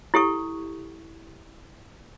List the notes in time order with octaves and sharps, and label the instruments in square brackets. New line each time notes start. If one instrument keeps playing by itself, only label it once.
[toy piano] E4 G4 A4 C#6